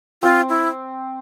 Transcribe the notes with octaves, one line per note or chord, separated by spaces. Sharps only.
C4 F4
E4